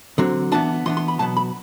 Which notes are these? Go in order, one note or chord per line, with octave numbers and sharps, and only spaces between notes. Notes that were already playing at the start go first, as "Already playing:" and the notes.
D3 F#3 C4
E3 B3 D4 A5
E3 B3 D4 C6
C6
B5
B2 F#3 B3 A5
B5